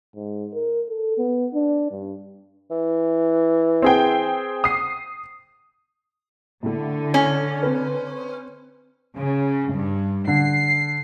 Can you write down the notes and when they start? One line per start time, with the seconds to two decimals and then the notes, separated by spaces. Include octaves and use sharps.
0.15 G#2
0.54 A#4
0.89 A4
1.18 B3
1.54 D4
1.91 G2
2.71 E3
3.82 C4 G#4 G5
4.64 D#6 C7
6.63 A2 D3 A3
7.14 C#4
7.63 C4 B4
9.17 C#3
9.74 G2
10.27 D3 C7